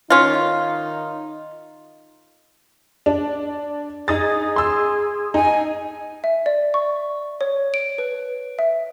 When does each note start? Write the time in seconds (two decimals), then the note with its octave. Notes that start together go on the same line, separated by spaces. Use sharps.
0.10 D#3 C#4 D#4 F4
3.06 D4
4.08 D#4 G#4 D#6 A6
4.56 C6 E6
5.34 D#4 G#5
6.24 E5
6.46 D5
6.74 C#6
7.41 C#5
7.74 D7
7.98 B4
8.59 E5